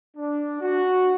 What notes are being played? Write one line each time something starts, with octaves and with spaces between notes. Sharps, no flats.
D4
F#4